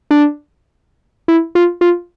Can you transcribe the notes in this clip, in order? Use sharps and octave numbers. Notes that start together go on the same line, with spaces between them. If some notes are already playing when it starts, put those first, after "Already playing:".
D4
E4
F4
F4